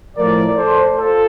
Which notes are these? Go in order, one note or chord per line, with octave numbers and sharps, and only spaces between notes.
A2 F3 A3 A#4 D5
A4 C5
F4 A4